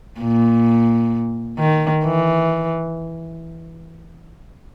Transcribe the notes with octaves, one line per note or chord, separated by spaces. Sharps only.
A#2
D#3
E3